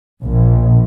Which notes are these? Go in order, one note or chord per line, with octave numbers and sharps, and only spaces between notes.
A#1